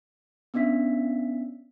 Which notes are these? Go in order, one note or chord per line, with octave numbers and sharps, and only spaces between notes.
B3 C#4 D4 E5 B6